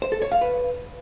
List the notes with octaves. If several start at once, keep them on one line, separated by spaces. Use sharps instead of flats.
C5
A4
C#5
F5
B4